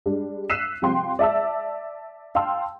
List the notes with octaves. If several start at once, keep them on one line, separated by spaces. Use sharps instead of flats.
G3 G#3 D4
E6 F#6 B6 C7 D#7 E7
C3 F3 G3 G5 C6
D5 E5 A5 E6
F5 G5 A5 C6 E6